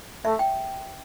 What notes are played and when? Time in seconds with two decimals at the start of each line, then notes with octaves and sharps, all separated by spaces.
0.25 A3 E5
0.39 G5